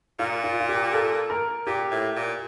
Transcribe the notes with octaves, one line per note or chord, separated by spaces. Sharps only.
A#2 F4
F4
F4
G4
A4
A#4
A#2 G4
A2
A#2